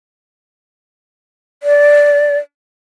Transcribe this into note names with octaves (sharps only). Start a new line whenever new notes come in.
D5